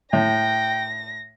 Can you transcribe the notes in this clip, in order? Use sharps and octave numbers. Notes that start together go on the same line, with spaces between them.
A2 G5 A#6